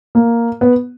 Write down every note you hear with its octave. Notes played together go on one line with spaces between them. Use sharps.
A#3
B3